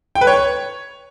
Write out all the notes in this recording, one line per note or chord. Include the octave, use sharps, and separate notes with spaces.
G5
B4
C#5